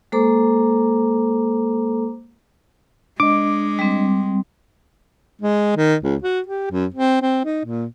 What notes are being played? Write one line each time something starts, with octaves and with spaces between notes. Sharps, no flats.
G#3 A#3 A4 C5 A#5 D6
G#3 D4 D#5 D6
G3 C4
G#3
D#3
C#2
F#4
G4
F#2
C4
C4
D#4
A#2